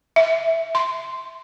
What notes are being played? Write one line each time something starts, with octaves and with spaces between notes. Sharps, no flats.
E5
C6